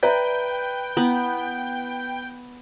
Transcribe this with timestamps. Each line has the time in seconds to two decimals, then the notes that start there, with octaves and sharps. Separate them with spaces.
0.03 B4 D5 E5 G5 A#5
0.97 B3 E4